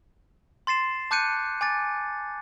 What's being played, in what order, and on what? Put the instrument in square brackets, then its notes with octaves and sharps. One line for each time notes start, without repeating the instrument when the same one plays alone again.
[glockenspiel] C6 A6 C7 E7
A5 D6 F#6 G6 C#7 D#7
G#5 D6 A6